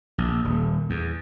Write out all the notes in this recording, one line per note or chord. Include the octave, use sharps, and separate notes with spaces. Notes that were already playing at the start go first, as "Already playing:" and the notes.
A#1
D#1
E2